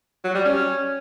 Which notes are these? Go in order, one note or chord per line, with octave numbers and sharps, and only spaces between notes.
F#3
G3
C#4